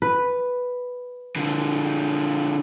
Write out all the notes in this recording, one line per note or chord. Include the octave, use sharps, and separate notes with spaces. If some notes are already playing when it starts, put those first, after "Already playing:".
B4
D3 F3